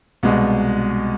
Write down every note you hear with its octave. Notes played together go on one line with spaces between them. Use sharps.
C2 B2 G#3